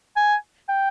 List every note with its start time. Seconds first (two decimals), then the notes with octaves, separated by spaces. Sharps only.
0.16 G#5
0.69 G5